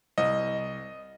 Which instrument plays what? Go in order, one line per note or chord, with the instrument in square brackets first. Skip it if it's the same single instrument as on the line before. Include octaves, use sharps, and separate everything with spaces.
[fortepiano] C2 [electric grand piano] D#5